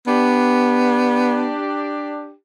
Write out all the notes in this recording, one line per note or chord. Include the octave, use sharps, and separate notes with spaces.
B3 D4 G4